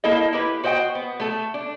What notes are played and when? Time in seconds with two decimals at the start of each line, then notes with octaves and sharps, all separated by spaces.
0.04 A#3 E4 A4 D#5
0.33 E4 G4 B4
0.63 F#4 C5 D#5 F#5 G5
0.95 B3
1.20 A3 A4
1.54 D4